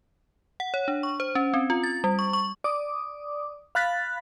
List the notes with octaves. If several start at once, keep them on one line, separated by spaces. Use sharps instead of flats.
F#5
C#5
D4
C#6
C5
C#4
C4
F4
A6
G3
C#6
C#6
D5 D6 D#6
F5 B5 F#6 A6 B6